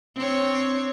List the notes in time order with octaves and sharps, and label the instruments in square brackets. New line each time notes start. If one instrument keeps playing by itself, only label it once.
[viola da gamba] C4 D4 C#5